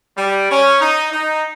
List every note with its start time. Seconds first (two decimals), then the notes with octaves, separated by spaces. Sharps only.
0.17 G3
0.49 C#4
0.80 D#4
1.12 D#4